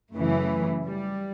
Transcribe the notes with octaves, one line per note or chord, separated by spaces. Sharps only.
F#2 C#3 E3 A3
G3